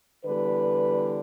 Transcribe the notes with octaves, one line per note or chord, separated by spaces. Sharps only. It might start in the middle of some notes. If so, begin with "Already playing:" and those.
E2 D3 G3 B4